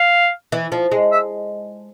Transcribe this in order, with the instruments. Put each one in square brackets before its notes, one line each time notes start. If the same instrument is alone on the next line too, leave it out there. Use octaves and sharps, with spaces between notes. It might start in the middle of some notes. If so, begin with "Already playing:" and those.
Already playing: [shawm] F5
[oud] E3
F3
G#3
[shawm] E5